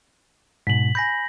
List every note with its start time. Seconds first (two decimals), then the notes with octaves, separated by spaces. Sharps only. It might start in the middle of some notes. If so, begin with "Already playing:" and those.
0.67 G#2 B2 B6 F#7
0.95 G#5 B5 G6 A#6